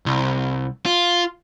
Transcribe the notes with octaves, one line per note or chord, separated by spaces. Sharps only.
C2
F4